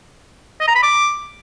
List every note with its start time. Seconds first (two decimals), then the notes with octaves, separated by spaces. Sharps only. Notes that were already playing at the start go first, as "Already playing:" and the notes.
0.60 D#5
0.68 A#5
0.75 B5
0.83 D6